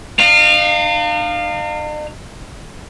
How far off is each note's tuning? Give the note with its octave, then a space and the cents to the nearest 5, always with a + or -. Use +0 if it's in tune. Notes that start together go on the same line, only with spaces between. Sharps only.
D#4 -45 F5 +0